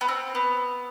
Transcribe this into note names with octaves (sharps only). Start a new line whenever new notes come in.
B3
C4
B3